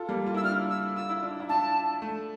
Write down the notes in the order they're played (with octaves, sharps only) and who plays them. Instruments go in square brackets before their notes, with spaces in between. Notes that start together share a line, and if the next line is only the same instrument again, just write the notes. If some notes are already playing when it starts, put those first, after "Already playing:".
Already playing: [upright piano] F4 A4
G3 A#3
F4
[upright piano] E4 [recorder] E6
[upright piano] D4 F4 [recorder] F6
[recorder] E6
[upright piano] F4 [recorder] E6
[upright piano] E4
D4 F4
E4
[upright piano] D4 F4 [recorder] A5
[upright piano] A3